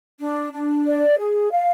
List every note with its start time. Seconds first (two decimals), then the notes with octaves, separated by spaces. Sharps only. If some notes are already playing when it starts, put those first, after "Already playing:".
0.19 D4
0.53 D4
0.86 D5
1.18 G#4
1.51 F5